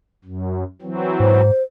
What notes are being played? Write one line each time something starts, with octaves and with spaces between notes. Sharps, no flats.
F#2
E3 F#3 C4
G#2 C5